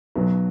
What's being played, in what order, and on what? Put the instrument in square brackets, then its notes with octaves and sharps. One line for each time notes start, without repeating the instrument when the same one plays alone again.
[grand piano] B1 B2 F#3